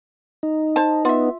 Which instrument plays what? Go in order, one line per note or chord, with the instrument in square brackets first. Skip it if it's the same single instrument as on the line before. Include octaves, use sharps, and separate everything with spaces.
[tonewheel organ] D#4
[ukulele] C5 A5
[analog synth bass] B3 [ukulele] F4 E5